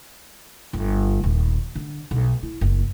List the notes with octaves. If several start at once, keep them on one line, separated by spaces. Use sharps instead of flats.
G1
D#1
D3
B1
E4
F#1